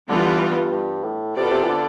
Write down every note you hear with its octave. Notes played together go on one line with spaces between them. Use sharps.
D3 E3 G3 B3 F4
D3
G2
G2
G2
A2
C3 B3 F4 A4 D5
B2
C3
E3
D3